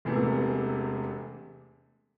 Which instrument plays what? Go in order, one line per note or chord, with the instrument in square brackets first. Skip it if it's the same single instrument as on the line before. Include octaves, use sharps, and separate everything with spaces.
[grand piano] E1 E2 C3 E3 A3